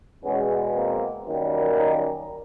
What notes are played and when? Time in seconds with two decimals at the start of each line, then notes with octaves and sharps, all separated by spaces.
0.24 E2 B2 G#3 B3 C#4
0.74 A#3 C4
1.26 F#2 D#3 G3 A#3
1.77 C#4 D#4